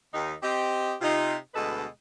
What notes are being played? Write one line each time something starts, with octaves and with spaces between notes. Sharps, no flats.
D#2 D#4
C4 G4 D#5
C3 D#4 F4
D2 B2 G#3 A4 B4 D#5